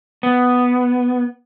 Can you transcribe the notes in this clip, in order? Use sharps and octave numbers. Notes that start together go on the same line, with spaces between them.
B3